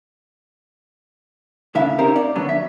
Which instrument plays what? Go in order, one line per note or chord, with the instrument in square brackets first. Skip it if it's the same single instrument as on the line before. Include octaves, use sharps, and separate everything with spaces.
[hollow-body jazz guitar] A2 C#3 D4 E5 F5
C4 C#4 D#4 G4 A#4 C5
D5
D3 F#3 B3 D4
E5